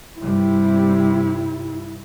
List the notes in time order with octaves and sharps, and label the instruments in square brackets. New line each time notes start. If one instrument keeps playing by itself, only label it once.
[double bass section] G2 C3 G3 [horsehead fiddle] E4